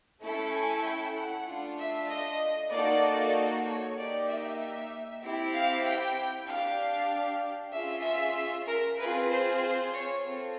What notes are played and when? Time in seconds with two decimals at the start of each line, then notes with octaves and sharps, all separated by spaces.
0.21 A3 C#4 E4 A4
0.51 G#5
0.83 G5
1.14 F#5
1.46 A3 D4 F4
1.77 E5
2.08 D#5
2.71 A#3 D#4 F#4 A4 D5
3.65 C#5
3.96 A#3 D#4 G4 D5
4.28 E5
5.22 C4 E4 G4
5.54 F5
5.86 G5
6.48 D4 G4 F5
7.73 C#4 F4 G#4 E5
8.04 E5
8.67 A#4
8.98 C4 F4 G#4 B4
9.30 C5
9.62 C5
9.93 C#5
10.24 C4 F4 A4